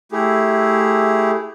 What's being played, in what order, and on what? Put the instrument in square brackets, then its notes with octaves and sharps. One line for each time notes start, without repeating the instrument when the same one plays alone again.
[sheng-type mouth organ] A3 E4 G4 G#4